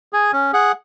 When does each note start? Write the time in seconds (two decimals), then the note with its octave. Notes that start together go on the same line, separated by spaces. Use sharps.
0.13 G#4 G#5
0.33 C#4
0.53 G#4 F#5